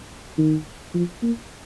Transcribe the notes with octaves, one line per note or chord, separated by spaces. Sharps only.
D#3
F3
A#3